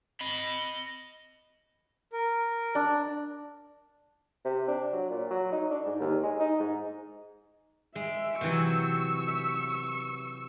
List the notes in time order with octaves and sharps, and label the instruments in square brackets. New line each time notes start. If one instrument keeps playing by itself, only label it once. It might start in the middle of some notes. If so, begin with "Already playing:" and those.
[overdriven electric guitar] D#5 B5
[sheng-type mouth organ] A#4
[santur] D4
[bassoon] C3
D4
F#3
A#2
F#3
D#4
D4
G#2
D#2
G#3
D#4
G#2
[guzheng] G#3 [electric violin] E5 D7
[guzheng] C3 E3 F#3 [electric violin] C#6 E6
[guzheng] E5